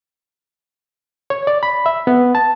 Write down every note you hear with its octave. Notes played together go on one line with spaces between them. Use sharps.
C#5
D5
B5
E5
B3
A5